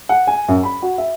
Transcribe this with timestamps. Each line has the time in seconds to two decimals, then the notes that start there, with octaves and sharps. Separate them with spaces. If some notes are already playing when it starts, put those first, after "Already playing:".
0.09 F#5
0.27 G#5
0.48 F#2
0.63 B5
0.82 F#4
0.98 E5